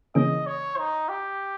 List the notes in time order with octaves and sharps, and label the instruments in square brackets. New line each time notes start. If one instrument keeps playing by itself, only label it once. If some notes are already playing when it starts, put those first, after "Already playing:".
[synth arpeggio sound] C#3 E3 A#3 C#4 G#4 [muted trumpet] D#5
[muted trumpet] C#5
D#4
G4